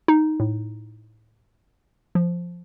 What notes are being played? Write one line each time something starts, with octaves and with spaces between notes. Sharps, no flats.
D#4
A2
F3